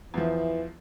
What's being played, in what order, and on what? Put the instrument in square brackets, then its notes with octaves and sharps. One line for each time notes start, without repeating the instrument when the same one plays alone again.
[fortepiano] E2 F3 [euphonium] E3